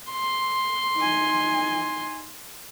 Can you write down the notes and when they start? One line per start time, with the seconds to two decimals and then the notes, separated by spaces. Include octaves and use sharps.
0.11 C6
0.96 D#4 G#5